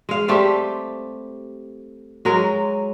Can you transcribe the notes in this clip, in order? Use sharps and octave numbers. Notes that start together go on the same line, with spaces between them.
G#3 F5
G3 A3 C4 G4
F#3 G#3 A#4